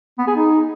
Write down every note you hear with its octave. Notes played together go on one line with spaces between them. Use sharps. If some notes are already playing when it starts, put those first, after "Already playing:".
B3
G#4
D#4